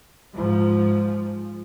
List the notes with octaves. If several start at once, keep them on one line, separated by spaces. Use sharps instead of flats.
G#2 F3